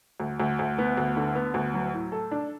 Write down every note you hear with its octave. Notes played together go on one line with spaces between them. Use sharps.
D2
D2
D2
B3
D2
D3
B3
D2
F#3
A2
A4
D4